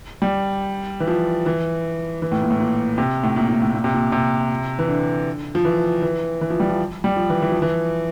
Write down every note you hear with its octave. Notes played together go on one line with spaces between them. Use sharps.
G3
E3
F3
E3
E3
A2
A#2
A2
A#2
C3
A2
A#2
A#2
A2
A#2
C3
A#2
C3
E3
D3
F3
E3
E3
E3
F3
G3
F3
G3
F3
E3
E3
F3
E3